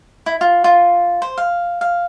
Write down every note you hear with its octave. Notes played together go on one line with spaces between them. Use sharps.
E4
F4
F4
C5
F5
F5